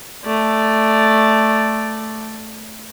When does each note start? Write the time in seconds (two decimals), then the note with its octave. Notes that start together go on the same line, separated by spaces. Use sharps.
0.25 A3 D5